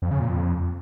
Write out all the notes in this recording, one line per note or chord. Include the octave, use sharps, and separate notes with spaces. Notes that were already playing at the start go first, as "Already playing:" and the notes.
F2
C#3
A#2
F2